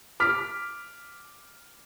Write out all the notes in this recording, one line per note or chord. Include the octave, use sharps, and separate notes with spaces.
D6 F6 B6